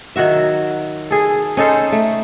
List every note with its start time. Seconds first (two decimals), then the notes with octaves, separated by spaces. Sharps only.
0.16 D#3 F#3 F#4 E5
1.11 G#4 A4
1.57 C#4 D#4 A4 C5
1.92 A3